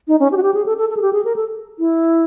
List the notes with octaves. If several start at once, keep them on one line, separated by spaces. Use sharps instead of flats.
D#4
C#4
G4
F#4
G4
G#4
A4
A4
A4
G#4
G4
G#4
A#4
A4
E4